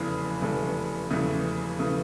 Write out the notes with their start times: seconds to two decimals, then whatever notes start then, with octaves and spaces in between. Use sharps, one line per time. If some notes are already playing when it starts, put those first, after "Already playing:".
Already playing: F1 E2 C#3 E3 A3
0.41 F1 E2 C#3 E3 A3
1.10 F1 E2 C#3 E3 A3
1.79 C#3 E3 A3